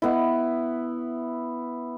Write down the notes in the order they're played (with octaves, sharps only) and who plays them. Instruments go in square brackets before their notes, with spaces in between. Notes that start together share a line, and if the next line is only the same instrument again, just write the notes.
[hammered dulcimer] B3 E4